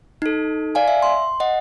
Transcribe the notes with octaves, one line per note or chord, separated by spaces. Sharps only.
D#4 A4
D5 F5 G#5
E5
C6
D#5 F#5